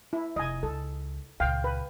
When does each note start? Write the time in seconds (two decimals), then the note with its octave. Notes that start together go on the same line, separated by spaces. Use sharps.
0.13 E4
0.36 F1 D#5 G#5
0.63 C#2 A4
1.40 C#2 A#2 F5 G5
1.64 B4